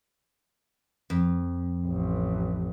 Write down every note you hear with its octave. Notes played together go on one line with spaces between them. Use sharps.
F2
A1